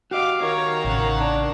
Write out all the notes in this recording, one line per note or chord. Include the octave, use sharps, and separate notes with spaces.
F#4 G4 D#5 F5 D6
D#3 C#5 F5 A#5
A1 C#3 C#5 F#5
D4